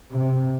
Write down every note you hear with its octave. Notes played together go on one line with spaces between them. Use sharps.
C3